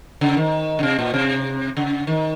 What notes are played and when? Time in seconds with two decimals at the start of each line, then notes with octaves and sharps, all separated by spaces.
0.21 C#3
0.37 D#3
0.79 C#3
0.83 C3
0.99 A#2
1.14 C3
1.77 C#3
2.07 D#3